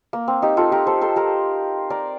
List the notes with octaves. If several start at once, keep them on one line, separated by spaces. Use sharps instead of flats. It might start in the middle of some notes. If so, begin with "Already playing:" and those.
A#3
C4
D#4 G4
F4 A4
G4 A#4
A4 C5
A4 C5
G4 A#4
A#4 D5